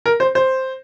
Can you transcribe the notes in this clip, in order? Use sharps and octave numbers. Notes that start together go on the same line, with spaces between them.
A#4
C5
C5